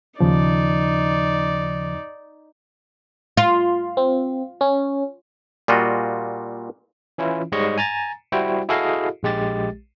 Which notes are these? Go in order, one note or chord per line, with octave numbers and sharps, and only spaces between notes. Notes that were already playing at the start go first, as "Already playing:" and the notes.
D#2 C#3 F3 D#4 D5
F4
C4
C#4
A#2 G3 F4 F#4 D#5
E3 C#4 E4 F4
G#2 G3 G#3 C#5 D#5 C#6
G#5 A#5 A6
G3 E4 F#4 C5 G5
E4 F#4 G#4 A4 D#5 F5
A#1 G#3 G4 A6